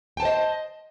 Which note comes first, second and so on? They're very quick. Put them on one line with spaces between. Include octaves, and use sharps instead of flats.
G5 A5 C5 D#5